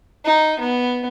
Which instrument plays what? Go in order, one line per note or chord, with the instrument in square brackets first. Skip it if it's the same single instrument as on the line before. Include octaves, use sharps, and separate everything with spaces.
[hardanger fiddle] D#4
B3